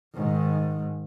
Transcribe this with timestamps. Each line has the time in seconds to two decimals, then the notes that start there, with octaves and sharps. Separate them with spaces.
0.14 G#2 D#3